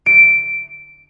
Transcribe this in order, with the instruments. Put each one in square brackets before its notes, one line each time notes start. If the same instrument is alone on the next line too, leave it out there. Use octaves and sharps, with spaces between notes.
[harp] D7